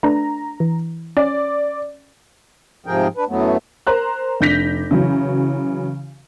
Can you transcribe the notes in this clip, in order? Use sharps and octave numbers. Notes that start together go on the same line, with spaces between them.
A3 D4 B4 A#5
E3
C#4 D5
G#2 C3 F3 G#4 A#4 G5
D4 B4
F#2 E3 F#3 A3 B3
A#4 C5 A#5 F#6
F1 D4 G6 A#6 B6 F7
C#3 E3 F#3